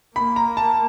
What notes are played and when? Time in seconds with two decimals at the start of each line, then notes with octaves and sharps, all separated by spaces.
0.16 A#3 B5
0.36 A#5
0.57 A5